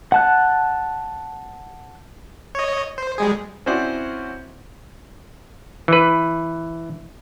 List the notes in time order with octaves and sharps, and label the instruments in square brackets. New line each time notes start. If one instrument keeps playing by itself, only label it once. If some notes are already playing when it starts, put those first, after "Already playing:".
[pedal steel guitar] F#5 A5 F#6
[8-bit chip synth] C#5 D#5
C5
G3 G#3 G#4
[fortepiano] C4 C#4 E4 F#4 C5 D5
[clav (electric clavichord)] E3 B4